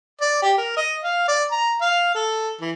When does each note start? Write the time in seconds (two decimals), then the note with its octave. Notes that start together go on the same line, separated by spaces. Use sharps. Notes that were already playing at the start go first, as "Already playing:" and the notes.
0.21 D5
0.42 G4
0.57 A#4
0.77 D#5
1.04 F5
1.28 D5
1.52 A#5
1.81 F5
2.15 A4
2.61 E3